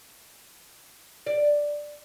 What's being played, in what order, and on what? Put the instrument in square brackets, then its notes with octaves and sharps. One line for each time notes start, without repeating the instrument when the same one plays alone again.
[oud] D5